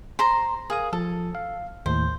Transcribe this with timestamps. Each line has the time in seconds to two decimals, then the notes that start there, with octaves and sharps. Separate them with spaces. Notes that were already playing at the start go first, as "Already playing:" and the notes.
0.19 C5 A#5 C6
0.70 G#4 A#4 F5 D#6
0.93 F3 A4
1.35 F5
1.86 D#2 A2 C5